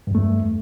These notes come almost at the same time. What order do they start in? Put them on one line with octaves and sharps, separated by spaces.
G2 E2 A3